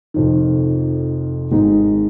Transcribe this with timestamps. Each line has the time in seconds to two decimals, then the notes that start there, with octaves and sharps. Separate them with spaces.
0.14 F1 F2 D#3
1.51 G#1 G#2 D#3 G#3 D#4